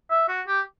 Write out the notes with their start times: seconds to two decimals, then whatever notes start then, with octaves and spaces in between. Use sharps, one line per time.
0.10 E5
0.28 F#4
0.47 G4